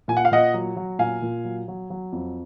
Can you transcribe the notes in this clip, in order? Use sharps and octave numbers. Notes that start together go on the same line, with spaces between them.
A#2 G#5
F#5
F5
A#2 D#5 F#5
F#3
F#3
A#2 F5 G#5
A#2
F#3
F#3
F#3
F2